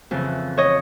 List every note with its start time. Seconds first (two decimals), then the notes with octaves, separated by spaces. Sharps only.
0.11 F2 C#3 E3
0.57 C#5 D#5